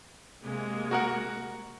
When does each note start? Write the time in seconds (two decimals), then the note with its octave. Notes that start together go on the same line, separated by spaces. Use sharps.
0.43 C3 G#3 A#3
0.91 F#4 A#4 F#5